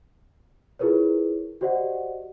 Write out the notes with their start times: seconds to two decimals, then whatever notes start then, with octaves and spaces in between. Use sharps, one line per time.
0.79 E4 F4 G#4 A#4 B4 C#5
1.61 F#4 G4 C5 D5 D#5 F#5